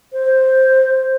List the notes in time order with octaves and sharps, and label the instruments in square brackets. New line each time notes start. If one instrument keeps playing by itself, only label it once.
[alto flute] C5